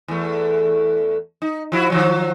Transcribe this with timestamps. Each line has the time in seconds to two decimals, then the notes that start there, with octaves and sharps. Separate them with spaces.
0.08 E2 A3
1.42 D#4
1.72 F3 E4 F#4
1.90 D#3 F3 F#3